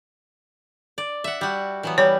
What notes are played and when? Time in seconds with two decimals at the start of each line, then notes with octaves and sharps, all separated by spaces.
0.98 D5
1.24 E5 F#5
1.41 G3 F#4
1.83 E3 F#3 B3
1.98 G3 C#5